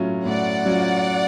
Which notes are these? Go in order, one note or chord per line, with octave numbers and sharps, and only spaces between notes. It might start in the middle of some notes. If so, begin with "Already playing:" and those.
Already playing: A2 F#3 C#4 F4
A2 D5 F#5
F#3 C#4 F4